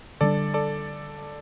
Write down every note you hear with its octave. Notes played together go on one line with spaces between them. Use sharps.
D3 G3 D4 A4 D5
A4 D5